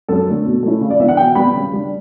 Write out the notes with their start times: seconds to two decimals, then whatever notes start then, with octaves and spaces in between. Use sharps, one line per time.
0.08 F#2 A4
0.27 D3 A3
0.46 B2
0.63 A3 C#4 E4
0.81 C#3
0.90 D5
1.00 E3 B3 D4 E5
1.08 F#5
1.17 B2 G5
1.35 G3 B3 B5
1.54 C#3
1.72 G3 D4